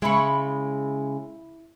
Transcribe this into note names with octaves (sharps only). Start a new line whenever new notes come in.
C#3 G#3 E4 B5 C#6